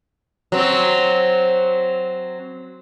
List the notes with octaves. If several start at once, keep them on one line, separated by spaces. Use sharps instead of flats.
F#3 C4